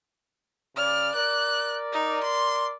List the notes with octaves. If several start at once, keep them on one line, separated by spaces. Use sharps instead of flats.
C#3 D5 F6
A#4 D5 F#6
D#4
C6